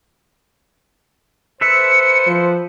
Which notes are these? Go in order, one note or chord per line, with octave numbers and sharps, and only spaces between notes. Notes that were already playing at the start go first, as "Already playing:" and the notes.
A4 B4 C5 E5 C#7
F3